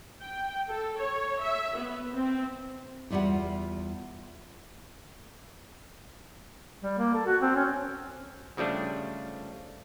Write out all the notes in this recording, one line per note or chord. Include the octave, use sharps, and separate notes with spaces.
G5
A4
C#5
E5
B3
C4
E2 G3 F4 G4 F#5
G3
A#3
A4
F#4
C4
C#4
C#3 F3 G3 A3 D4